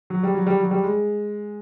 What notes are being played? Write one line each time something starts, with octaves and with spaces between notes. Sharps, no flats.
F#3
G3
F#3
G3
F#3
G3
G#3